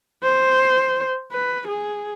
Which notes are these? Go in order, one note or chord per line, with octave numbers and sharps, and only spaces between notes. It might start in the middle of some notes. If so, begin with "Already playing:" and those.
C5
B4
G#4